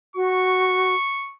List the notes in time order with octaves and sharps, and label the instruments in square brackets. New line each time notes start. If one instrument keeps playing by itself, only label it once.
[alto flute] F#4 [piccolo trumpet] C#6